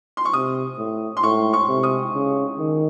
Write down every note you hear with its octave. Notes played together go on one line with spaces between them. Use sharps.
C6
C#6
C3 D#6
A2
C6
A2 C#6
C#6
C3
D#6
C#3
D#3